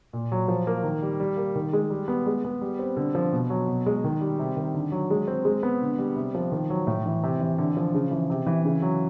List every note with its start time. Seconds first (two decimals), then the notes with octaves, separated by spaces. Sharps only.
0.13 A#2
0.32 F#3
0.48 F3
0.67 A#3
0.84 D#3
1.02 G3
1.20 G3
1.37 A#3
1.55 D#3
1.73 G#3
1.90 G3
2.08 B3
2.26 G#3
2.45 B3
2.61 G3
2.79 C4
2.97 D3
3.15 F3
3.32 B2
3.50 F#3
3.68 B2
3.86 G#3
4.04 D#3
4.21 G3
4.39 C3
4.56 D#3
4.74 D3
4.92 F#3
5.11 G#3
5.28 C4
5.45 G#3
5.63 B3
5.81 D3
5.98 G3
6.16 C3
6.35 F3
6.52 D#3
6.70 F#3
6.87 A2
7.06 E3
7.23 C3
7.40 E3
7.58 D3
7.77 F3
7.94 C#3
8.11 E3
8.30 C3
8.47 E3
8.65 C#3
8.82 F#3